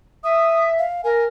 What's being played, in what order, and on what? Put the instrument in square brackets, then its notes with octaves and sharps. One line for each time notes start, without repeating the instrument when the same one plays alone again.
[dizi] E5 [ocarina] D#6
[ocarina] F5
[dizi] A#4 [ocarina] G#5